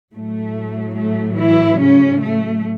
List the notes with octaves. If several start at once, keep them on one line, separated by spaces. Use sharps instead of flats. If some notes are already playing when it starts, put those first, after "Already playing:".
A2 F#3 A3
A3
E3 E4
C#3 C#4
A3